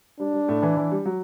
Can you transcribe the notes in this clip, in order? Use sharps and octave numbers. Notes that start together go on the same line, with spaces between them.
G3 D4
G3
A2 A3
E3 E4
E3 E4
G3
F#3